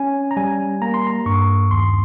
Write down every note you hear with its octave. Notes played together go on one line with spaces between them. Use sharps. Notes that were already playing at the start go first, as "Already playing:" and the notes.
Already playing: C#4 G#5
A#5
G3 G#5
A#3 A#5
C6
A#5
G2 C#6
D#2 C6